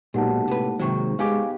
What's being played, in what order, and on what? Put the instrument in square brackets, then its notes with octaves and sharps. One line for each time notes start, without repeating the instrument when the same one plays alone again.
[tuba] B1 [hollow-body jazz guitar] A#2 [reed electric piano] G#3 A#3 D#4 [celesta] G4 F#5 A5
[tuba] A2 [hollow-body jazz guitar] C3 B4
[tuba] G#2 [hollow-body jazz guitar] C3 D#3 F#3 [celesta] C5 C#6
[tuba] G#3 [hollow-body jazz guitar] B3 D#4 G4 [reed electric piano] F5 G#5 D6